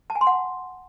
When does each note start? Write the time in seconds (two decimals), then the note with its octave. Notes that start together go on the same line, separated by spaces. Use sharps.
0.10 A5
0.15 G#5
0.21 C6
0.27 F#5